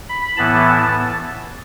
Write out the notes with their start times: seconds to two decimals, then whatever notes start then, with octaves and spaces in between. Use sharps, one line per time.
0.09 B5
0.37 A2 E3 B3 A5